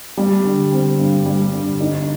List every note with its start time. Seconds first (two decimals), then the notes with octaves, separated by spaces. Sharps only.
0.17 G3
0.45 D3
0.72 C4
0.99 G2
1.26 G3
1.53 D3
1.80 D#4